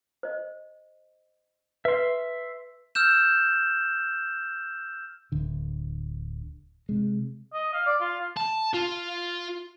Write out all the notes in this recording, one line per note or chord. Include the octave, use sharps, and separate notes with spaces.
C5 D#5
B4 E5 C6
E6 F6 G6 E7
D1 D3
C3 G#3
D#5
F5
D5
F4
A5
F4